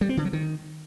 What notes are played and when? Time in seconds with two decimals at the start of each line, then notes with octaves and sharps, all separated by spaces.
0.01 G3
0.09 C4
0.17 D3
0.25 F#3
0.33 D#3